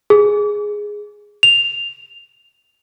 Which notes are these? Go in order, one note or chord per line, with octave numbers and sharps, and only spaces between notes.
G#4
F7